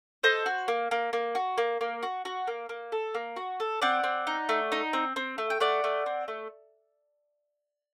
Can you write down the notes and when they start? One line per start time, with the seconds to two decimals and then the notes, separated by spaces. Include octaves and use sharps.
0.23 A4 C5 D#5
0.46 F#4
0.68 A#3
0.91 A#3
1.13 A#3
1.35 F#4
1.58 A#3
1.81 A#3
2.03 F#4
2.25 F#4
2.47 A#3
2.69 A#3
2.92 A4
3.14 A#3
3.36 F#4
3.60 A4
3.82 C4 D5 F#5
4.04 C4
4.27 D#4
4.49 A3
4.72 D#4
4.93 C4
5.16 C4
5.38 A3
5.50 G5
5.60 A3 D5 F#5
5.84 A3
6.06 C4
6.28 A3